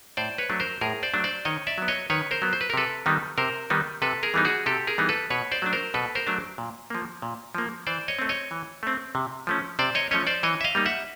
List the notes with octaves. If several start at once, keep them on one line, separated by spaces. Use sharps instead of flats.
A2 C5 D5
B4 C#5
F#3 A3 D4
A#4 C5
A2 G#4 A#4
C5 D5
F#3 A3 D4
C5 D5
D#3 C#5 D#5
D5 E5
F#3 B3
C#5 D#5
D#3 B4 C#5
A#4 C5
F#3 B3
C5
B4
A#4
C3 A4 B4
D#3 G3 B3 D#4
C3 A#4 C5
D#3 G3 B3 D#4
C3 A4 B4
G#4 A#4
E3 G3 B3 D#4
F#4 G#4
C3 G4 A4
G#4 A#4
E3 G3 B3 D#4
A4 B4
B2 B4 C#5
C5 D5
F#3 A3 D4
A#4 C5
B2 A4 B4
A#4 C5
F#3 A3 D4
A#2
F3 A#3
A#2
F3 A#3
E3 C5 D5
C#5 D#5
A3 C4
C#5 D#5
E3
A3 C4
C3
F3 A3 C#4
C3 C5 D5
C#5 D#5
F3 A3 C#4 C#5 D#5
C5 D5
E3 C#5 D#5
E5
D#5 F5
G3 A#3 D#4
E5 F#5